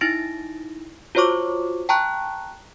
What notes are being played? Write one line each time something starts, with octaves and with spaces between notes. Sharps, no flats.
D#4 E4 A6 A#6 D7
F4 F#4 C5 C#5 C#6 D6
G5 A5 A#5 C#6 F#6